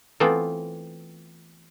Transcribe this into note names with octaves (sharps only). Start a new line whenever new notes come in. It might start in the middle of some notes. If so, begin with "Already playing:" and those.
E3 A3 B3 C4 F4